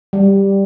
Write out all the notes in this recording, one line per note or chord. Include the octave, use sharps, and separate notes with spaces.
G3